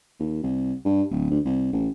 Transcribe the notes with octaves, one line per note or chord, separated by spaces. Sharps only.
D#2
C2
G2
D1
D2
C2
A1